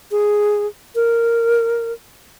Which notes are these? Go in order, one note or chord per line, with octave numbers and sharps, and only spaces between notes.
G#4
A#4